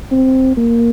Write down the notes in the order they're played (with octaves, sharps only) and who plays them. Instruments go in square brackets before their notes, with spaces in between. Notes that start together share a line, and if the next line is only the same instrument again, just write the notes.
[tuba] C4
A#3